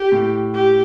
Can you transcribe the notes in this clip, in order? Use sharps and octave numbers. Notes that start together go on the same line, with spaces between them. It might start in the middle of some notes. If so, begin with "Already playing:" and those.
Already playing: G4
A2
G4